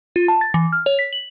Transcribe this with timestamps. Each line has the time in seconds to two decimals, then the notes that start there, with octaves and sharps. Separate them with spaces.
0.16 F4
0.28 A5
0.41 A6
0.54 E3
0.72 F6
0.86 C#5
0.99 B6
1.13 F#7